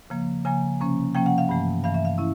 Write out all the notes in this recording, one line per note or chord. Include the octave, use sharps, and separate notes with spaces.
C#3 F3 A#3
C#3 F3 A#3 G#5
C3 F3 A#3 C#4
C3 F3 A#3 C#4 G5
F#5
F5
G2 E3 A3
G2 E3 A3 F5
E5
F5
C#4 E4